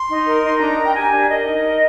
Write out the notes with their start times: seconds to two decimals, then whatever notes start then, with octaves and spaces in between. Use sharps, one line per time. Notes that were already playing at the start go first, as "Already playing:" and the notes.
Already playing: C6
0.09 D#4
0.26 A#4
0.43 D#4
0.60 D4 A#5
0.77 A#4
0.84 G5
0.94 G4 G#5
1.12 D4
1.29 A#4 D#5
1.46 D#4
1.63 A#4